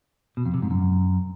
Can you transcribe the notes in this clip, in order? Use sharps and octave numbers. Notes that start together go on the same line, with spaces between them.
B2
F2
C3
G#2
F#2